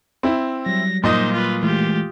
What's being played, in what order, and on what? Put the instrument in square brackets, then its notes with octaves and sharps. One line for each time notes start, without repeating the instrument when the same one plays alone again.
[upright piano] C4 E4
[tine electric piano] F#3 G3 [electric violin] A#6
[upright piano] A#2 D#5 D#6 [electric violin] D#4 C5
[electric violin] F4 B4
[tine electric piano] E3 G#3 A3 [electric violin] F4 G4